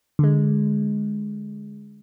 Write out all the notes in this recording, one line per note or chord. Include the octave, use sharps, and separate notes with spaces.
D3 G#3